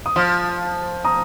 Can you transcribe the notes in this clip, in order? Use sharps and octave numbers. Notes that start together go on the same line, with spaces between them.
D#6
F3 C6 F6
A#5 D#6